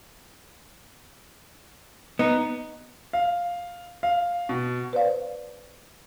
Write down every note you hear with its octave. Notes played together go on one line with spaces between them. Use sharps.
B3 D#4
F5
F5
B2
B4 C5 D5 F5